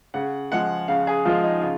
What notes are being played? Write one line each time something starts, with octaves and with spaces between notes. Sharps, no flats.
C#3 F#5
F3 G#3 F#5
C#3 F5
G#4
F3 G#3 F4
D#4
C#3 F4